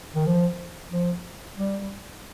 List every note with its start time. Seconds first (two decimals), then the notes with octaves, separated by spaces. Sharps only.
0.15 D#3
0.27 F3
0.92 F3
1.58 G3